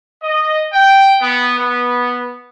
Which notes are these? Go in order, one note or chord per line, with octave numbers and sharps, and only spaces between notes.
D#5
G5
B3
B3